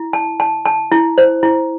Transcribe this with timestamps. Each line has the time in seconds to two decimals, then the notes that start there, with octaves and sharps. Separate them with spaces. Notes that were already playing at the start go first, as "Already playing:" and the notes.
Already playing: E4
0.13 A5
0.40 A5
0.65 A5
0.92 E4
1.18 C5
1.43 E4